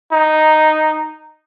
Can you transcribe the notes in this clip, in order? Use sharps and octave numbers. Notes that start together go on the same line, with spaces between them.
D#4